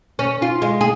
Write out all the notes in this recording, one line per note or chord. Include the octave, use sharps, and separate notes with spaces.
C#4
F4
G#3
G#4